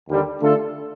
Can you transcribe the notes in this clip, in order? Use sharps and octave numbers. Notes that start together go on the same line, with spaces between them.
D#2 D3 G3
D3 A3 D4 F4 A4